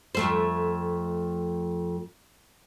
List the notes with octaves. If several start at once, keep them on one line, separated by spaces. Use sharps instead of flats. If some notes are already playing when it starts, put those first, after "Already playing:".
F2 A3 C5